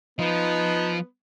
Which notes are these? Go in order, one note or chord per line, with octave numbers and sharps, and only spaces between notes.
F3 B3 D#4